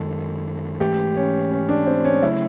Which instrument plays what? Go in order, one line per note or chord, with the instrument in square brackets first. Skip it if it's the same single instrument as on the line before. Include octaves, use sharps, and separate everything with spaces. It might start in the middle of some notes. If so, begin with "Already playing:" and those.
Already playing: [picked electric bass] F#2 D#3 G#3 [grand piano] A4
[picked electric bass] G#2 E3 A3 [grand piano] G4
[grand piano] C#4
C#4
D4
C4
C#4
[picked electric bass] C#3 F#3 A3 [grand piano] E4